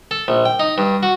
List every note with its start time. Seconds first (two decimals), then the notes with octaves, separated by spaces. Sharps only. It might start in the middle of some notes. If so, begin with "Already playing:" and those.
0.11 A4
0.28 A#1
0.45 G5
0.60 D#4
0.78 G2
1.03 F#4